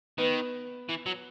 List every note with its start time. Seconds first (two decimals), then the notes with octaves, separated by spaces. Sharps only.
0.18 D#3 B3 B4
0.89 E3
1.06 F#3